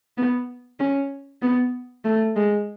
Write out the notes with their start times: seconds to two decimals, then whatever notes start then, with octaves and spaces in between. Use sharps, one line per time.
0.17 B3
0.80 C#4
1.42 B3
2.05 A3
2.36 G#3